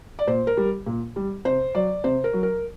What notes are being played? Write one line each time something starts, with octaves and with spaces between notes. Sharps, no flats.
D5
A#2 C5
A#4
G3
A#2
G3
C3 C5
F#3 D5
C3 C5
A#4
F#3
A#4